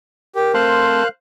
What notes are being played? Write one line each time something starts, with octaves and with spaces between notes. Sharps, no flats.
G4 A#4
A3 C4 C5 F5 F#6